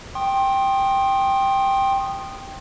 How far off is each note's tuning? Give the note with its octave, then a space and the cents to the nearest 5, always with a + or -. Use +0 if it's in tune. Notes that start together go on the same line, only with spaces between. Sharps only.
G5 +0 C6 +30 D#6 -15